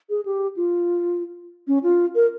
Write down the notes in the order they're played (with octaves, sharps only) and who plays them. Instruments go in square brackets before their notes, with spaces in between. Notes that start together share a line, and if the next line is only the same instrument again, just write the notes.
[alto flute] G#4
G4
F4
C#4
F4
A#4